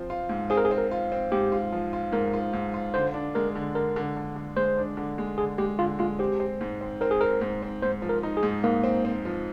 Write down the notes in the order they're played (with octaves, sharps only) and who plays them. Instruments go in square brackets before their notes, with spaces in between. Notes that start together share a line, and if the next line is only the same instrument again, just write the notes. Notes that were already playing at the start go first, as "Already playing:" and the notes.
Already playing: [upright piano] F3 C4
F4
G#2
[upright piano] C4 [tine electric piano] G#4
[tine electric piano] A#4
G#4
[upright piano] C4
[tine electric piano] A#4
[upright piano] F4
C4
[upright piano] G#2 [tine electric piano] G4
[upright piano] F4
F3
F4
[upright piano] G#2 [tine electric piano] A#4
[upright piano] F4
G#2
F4
[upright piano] D3 [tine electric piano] C5
[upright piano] D4
[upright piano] G#3 [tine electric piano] A#4
[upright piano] D3
[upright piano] D3 [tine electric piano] A#4
[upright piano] D3
D3
D3
[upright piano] G#3 [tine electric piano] C5
[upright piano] D4
D3
G#3
[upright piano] D3 [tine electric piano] G#4
[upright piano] G#3 [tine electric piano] G4
[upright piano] D3 [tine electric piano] F4
[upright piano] G#3 [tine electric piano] F4
[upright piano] C4 [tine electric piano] G4
[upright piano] C4
G#2
C4
[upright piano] C4 [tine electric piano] A#4
[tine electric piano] G#4
[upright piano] C4 [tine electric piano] A#4
[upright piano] G#2
C4
[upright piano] G#2 [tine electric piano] C5
[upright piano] F3
[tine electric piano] A#4
[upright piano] D#4
[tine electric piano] G#4
[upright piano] G#2
[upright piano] G#2 [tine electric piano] A#3
[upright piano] C4
C4
F3